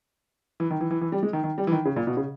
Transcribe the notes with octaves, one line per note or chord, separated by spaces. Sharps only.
E3
D#3
E3
E3
E3
G3
G#3
D#3
D#3
G3
E3
D#3
C#3
A#2
B2
C#3